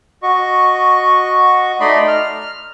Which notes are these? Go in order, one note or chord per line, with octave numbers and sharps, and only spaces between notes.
F#4 D#5 C#6
A3 D#4 D5 D#5 B5 C6
F6